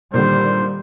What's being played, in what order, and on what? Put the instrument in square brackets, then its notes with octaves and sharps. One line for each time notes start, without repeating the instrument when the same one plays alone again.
[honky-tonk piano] A#2 D3 [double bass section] D#3 G3 [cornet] C5